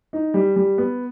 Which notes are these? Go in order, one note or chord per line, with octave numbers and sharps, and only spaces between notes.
D#4
G3
G3
B3